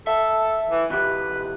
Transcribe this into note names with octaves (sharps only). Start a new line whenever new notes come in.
A4 E5
E3
B2 E3 G4 B4